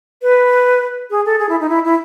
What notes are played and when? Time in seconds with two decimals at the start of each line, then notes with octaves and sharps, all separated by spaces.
0.22 B4
1.11 G#4
1.26 A4
1.39 G#4
1.49 E4
1.60 D#4
1.69 E4
1.84 E4